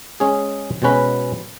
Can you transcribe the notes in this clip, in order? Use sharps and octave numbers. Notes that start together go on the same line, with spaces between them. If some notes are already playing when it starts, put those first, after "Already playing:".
G#3 C#4 G#4
B2 G#3 C#4 F#4 B4